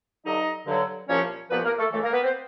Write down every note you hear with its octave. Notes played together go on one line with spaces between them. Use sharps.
G2 D3 F#3 D#4 D#5
G2 D3 F#3
C2 A#2 F3 C#4 C#5
C2 A#2 F3 B3 B4
A#3 A#4
A3 A4
C#2 C#3 E3 A3 A4
A#3 A#4
B3 B4
C4 C5